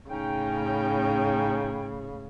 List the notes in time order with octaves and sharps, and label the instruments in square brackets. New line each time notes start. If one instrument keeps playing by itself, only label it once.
[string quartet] A2 C#3 [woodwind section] C#4 D#4 G5